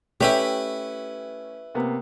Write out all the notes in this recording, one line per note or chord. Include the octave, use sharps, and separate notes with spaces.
A3 C#4 E4 G4 B4 C#5 E5 D6
C3 A#3 B3